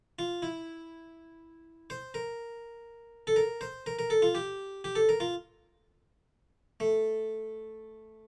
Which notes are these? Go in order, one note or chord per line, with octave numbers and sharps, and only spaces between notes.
F4
E4
C5
A#4
A4
A#4
C5
A#4
A#4
A4
F4
G4
G4
A4
A#4
F4
A3